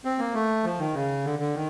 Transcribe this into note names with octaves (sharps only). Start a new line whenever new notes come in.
C4
A#3
A3
F3
D#3
C#3
D3
D3
D#3